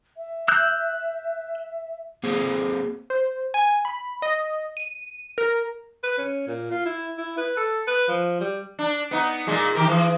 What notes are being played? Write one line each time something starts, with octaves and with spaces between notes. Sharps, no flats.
E5
E6 F#6 G6
A#3 C4 G#4 C5 F5
C5
G#5
B5
D#5
D#7
A#4
B4
C#4
A#2
F4
E4
E4
B4
A4
B4
F3
G3
D4
B3 D#4
A#2 G#3 A#3
D#3 G4 A#4
E3